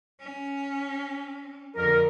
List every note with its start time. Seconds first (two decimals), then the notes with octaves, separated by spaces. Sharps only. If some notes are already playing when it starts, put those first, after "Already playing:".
0.20 C#4
1.76 F2 D3 A#4